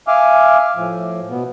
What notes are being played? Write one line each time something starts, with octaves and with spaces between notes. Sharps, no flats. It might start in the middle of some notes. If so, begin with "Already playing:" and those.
E5 F5 G#5 D6 F6
A2 F3
B2 B3